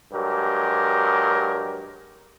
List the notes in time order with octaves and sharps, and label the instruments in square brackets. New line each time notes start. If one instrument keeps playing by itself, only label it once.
[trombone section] G2 F#3 G#3 G4 A#4